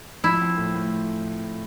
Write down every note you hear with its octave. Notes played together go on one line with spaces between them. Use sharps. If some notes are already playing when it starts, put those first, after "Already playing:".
F3 E4
C4
A2
A2